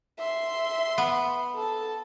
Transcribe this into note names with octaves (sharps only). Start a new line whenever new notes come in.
E5 C6
B3
A4 A5